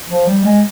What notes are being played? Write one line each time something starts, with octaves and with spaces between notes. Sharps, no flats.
F3
G3
G#3